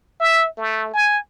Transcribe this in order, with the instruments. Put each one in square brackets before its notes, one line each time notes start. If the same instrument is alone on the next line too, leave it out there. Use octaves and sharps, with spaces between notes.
[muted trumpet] E5
A3
G#5